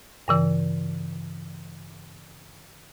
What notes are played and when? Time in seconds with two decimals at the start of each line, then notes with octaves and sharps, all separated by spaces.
0.28 G2 C#3 E3